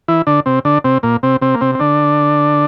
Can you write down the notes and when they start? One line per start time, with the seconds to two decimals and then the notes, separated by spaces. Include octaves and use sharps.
0.08 E3 E4
0.27 D3 D4
0.46 C3 C4
0.65 D3 D4
0.85 C3 C4
1.03 A#2 A#3
1.23 C3 C4
1.42 C3 C4
1.54 A#3
1.61 C3 C4
1.75 C4
1.80 D3 D4